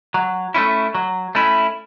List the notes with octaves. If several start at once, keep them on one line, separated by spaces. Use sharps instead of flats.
F#3
A3 C#4 E4
F#3
A3 C#4 E4